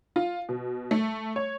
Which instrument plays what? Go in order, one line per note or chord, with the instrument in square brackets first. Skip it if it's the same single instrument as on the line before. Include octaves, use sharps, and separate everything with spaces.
[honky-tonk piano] F4
B2
A3
C#5